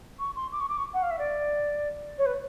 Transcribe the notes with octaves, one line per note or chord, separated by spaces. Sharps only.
C#6
C6
D6
C#6
D6
C#6
F#5
F5
E5
D5
C#5
B4